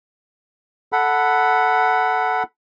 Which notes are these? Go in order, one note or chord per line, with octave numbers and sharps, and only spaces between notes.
A4 F#5 B5